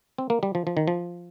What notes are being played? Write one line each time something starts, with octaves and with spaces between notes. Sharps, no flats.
C4
A#3
G3
F3
F3
D#3
F3